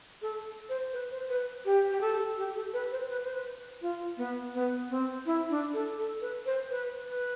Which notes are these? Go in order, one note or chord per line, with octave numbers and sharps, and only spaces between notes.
A4
C5
B4
C5
B4
G4
G4
A4
G4
A4
B4
C5
C5
B4
C5
B4
F4
B3
B3
C4
E4
D4
A4
A4
B4
C5
B4
B4